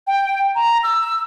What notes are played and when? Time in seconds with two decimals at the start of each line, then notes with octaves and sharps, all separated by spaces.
0.07 G5
0.55 A#5
0.83 E6